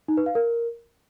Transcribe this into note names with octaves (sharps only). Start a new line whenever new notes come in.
D#4
B4
F5
A#4